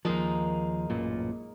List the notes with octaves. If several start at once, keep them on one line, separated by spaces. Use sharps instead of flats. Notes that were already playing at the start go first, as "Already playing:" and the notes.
D#2 F3 G#3 A#3 D#4
A1 F#2 A#2